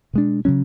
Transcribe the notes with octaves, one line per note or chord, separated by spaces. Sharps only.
B2 G#3 D4
C#3 F#3 C#4